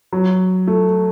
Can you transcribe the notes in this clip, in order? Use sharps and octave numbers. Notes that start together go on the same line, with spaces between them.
F#3
A3